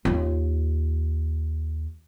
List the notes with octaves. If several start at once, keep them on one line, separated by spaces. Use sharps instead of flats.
D#2 F4